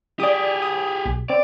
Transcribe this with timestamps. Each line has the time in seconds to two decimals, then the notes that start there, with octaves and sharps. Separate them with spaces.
0.20 G4 G#4 D5 D#6
0.62 D#6
1.06 B1
1.30 C4 D5